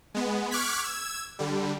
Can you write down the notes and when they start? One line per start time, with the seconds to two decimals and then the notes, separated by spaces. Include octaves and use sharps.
0.14 G#3 B3
0.51 C#6 D6 F6 F#6 G#6 B6
0.84 E6 G#6
1.39 D3 G3